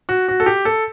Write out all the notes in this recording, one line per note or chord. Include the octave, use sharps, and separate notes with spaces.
F#4
F#4
A4
G4
A4